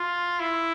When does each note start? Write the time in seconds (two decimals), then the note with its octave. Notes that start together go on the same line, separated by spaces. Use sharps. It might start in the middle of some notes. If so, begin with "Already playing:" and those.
Already playing: F4
0.40 E4